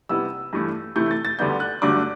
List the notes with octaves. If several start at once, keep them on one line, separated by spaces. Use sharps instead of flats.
C3 G3 B3 E4 E6
G2 E3 A3 E4
C3 E3 A3 E4 G6
G6
A6
A6
D2 D3 G3 B3 D4 G6
F#6
G2 D3 F#3 A3 D4 D6